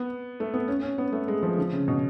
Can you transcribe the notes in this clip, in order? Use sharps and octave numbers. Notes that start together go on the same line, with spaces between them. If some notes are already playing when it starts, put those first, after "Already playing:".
Already playing: B3
A3
B3
C#4
C#4
B3
A3
G#3
F3
D3
C#3
B2